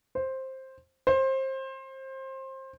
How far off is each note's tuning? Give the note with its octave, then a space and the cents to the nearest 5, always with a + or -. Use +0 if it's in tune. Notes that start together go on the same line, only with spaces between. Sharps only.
C5 +10
C5 +25